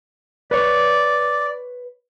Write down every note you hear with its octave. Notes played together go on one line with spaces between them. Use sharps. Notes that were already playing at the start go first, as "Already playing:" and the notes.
B4 C#5 D5